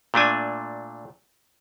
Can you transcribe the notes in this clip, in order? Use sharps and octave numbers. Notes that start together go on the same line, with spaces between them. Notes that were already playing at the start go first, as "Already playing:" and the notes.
A#2 A3 D4 G#5